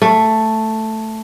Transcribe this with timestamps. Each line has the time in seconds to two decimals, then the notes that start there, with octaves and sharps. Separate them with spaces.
0.02 A3